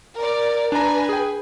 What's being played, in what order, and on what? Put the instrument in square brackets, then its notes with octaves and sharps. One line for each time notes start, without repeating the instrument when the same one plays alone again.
[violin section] A#4 D5
[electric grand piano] D4 A#5 [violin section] B4 G#5
[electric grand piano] G#4 G5